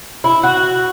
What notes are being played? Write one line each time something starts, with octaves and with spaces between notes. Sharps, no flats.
E4
F#4